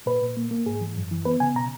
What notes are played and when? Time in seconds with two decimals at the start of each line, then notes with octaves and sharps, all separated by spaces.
0.06 A#2 B4
0.22 A#2
0.37 A#3
0.51 A#3
0.66 G#2 G#4
0.81 E3
0.97 F#2
1.11 E3
1.25 B3 B4
1.40 C#3 G#5
1.55 B2 A#5